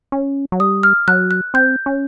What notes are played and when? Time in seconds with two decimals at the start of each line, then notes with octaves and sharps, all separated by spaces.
0.12 C#4
0.52 F#3
0.60 G3 D#6
0.83 F6
1.08 F#3 F#6
1.31 F#6
1.54 C4 G6
1.86 C#4